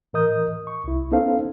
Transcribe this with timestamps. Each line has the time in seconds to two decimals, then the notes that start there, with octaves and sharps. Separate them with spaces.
0.13 A2 E3 A#4 D#5 D#6 G6
0.67 C#6
0.84 C2 E4
1.12 B3 C#4 D#4 A4 C5 F5